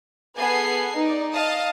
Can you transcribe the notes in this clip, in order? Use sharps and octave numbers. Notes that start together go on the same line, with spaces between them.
B3 G#4 A4 G#5 C7
D#4 D5
D#5 F5 A5 D#6